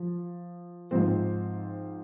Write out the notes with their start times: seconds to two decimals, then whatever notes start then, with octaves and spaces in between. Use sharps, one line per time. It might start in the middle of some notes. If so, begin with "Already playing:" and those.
Already playing: F3
0.91 G#2 F3 C4